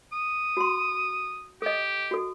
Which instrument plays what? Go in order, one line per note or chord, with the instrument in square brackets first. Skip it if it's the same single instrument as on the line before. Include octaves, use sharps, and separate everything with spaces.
[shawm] D#6
[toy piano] F#4 C6
[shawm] G4 [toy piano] A4 D#5
[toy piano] F#4 A4